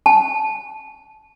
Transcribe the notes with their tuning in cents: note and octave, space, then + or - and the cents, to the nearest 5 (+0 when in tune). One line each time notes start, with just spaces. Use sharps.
A5 -20